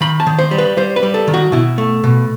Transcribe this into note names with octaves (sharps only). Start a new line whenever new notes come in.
D#3 B5
A5
D#3
C5
G3
B4
G3 C5
B4
G3
A4
D#3
F#4
B2 E4
A3
B2